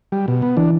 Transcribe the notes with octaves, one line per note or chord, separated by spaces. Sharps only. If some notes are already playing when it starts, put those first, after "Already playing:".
G3
B2
B3
E3 D4